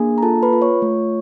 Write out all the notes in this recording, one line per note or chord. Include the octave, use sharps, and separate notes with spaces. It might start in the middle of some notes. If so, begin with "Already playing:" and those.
Already playing: A#3 D4 G#4 G#5
A#5
F4 A4 A5
B4 B5
F4
C#5 C#6
A3